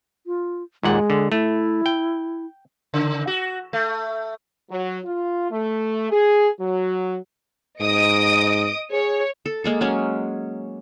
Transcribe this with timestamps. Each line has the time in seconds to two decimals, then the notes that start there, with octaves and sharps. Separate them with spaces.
0.27 F4
0.83 D#2 A#2 G#3 F#5
1.10 D3
1.32 A3 E4
1.86 G5
2.94 C#3
3.27 F#4
3.73 A3
4.71 F#3
5.05 F4
5.51 A3
6.11 G#4
6.60 F#3
7.81 G#2 D#5 D#6 D7
8.92 G#4 C#5
9.46 A4
9.64 G#3 A#3 A4
9.81 F#3 G#3 C#4